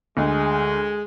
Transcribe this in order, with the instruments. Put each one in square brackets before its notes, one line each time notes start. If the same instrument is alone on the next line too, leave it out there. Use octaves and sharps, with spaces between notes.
[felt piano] D2 [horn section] G#3